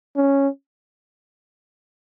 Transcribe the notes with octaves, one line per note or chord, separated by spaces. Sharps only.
C#4